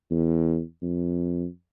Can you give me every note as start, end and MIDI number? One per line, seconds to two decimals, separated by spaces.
0.11 0.60 40
0.82 1.46 41